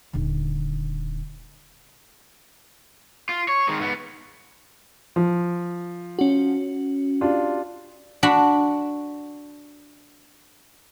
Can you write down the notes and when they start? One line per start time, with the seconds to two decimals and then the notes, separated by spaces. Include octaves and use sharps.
0.13 D#1 D3
3.29 F4
3.48 C#5
3.68 D#3 G#3
3.80 G#2 B3
5.16 F3
6.19 C#4 F#4
7.21 D4 F4 G4
8.23 D4 F#4 F#5 B5